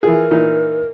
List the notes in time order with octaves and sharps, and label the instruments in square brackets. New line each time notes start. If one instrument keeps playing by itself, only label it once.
[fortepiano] E3 F4 G#4 [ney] A#4
[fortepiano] A#2 E3 D#4